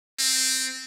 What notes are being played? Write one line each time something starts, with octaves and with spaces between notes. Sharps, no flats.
C4